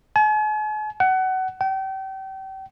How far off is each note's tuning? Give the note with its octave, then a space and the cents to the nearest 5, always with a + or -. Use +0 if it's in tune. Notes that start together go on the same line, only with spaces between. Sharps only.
G#5 +45
F#5 +25
G5 -35